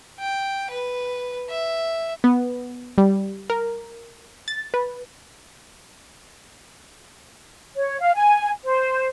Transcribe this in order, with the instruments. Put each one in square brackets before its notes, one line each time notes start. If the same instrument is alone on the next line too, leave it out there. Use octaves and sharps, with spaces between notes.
[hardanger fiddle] G5
B4
E5
[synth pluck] B3
G3
A#4
A6
B4
[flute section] C#5
F5
G#5
C5